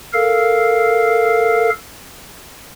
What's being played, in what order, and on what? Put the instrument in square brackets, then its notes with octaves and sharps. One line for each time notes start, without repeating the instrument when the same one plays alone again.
[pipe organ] A4 A#4 F5